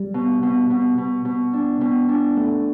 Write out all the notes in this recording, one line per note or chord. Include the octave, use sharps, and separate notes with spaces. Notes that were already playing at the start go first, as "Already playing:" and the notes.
Already playing: G3
B2
B2
B2
B2
B2
D4
B2
D4
A3